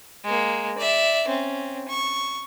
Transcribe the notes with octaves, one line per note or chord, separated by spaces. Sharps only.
G#3 A#3
D5 E5
C4 C#4
C#6